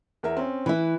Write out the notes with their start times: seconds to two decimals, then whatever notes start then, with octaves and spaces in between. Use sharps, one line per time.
0.23 E2 A#4 E5
0.37 C4 C#4
0.66 E3 E4 B4